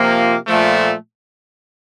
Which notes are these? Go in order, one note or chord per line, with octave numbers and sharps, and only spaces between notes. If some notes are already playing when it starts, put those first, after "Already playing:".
Already playing: C3 F3 A#3 F4
A#2 F3 A3